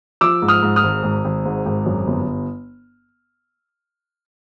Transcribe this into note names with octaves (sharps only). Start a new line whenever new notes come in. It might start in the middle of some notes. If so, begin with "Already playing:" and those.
F3 D6 E6
G#2
D#6 F6
G#2
D#6 F6
G#1
G#1
G#1
G#2
G#1
F#2
G1